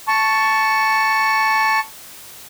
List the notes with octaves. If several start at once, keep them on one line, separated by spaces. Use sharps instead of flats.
A5 C#6